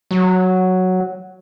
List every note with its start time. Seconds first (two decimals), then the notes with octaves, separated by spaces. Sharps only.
0.11 F#3